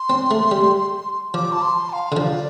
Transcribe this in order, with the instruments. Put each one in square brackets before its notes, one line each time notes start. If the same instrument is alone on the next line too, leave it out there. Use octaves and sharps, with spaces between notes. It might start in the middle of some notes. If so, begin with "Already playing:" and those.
Already playing: [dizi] C6
[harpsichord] C4
A3
G3
[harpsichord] F3 [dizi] D6
[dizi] A5
C6
A5
F5
[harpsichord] D3
[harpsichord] F3 [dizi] D5